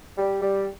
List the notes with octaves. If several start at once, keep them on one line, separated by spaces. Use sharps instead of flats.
G3
G3